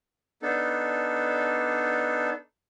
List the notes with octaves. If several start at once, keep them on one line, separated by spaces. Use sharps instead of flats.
B3 D4 D#4 A4